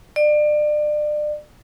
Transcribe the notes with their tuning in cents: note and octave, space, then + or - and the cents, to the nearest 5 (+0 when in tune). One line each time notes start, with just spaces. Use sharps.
D5 +30